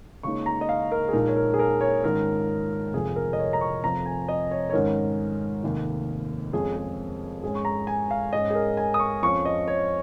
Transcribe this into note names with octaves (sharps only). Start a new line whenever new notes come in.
C#2 C#3 A#3 D#4 C#6
A#5
D#5
F5
A#4
G#4
A#1 A#2 G#3 D#4 A#4
C#5
A#4
G#4
A#4
C#5
G#2 D#3 C#4 A#4
F1 F2 F3 G#4
A#4
D#5
C#5
A#5
C#6
F1 F2 F3 A#5
G#5
D#5
C#5
C#5
G#2 D#3 C#4 A#4
F1 D#2 D#3
F2 F3 G#3 C#4 G#4
G#4
G#2 G#3 C#4 G#4
C#6
A#5
G#5
F5
G#2 G#3 C#4 D#5
G#4
A#4
G#5
D#6
C#6
F2 F3 C#4 C#6
D#5
C#5